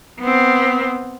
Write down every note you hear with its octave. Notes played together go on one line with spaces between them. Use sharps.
B3 C4